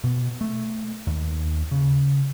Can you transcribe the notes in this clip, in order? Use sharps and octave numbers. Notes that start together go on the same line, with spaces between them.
B2
A3
D#2
C#3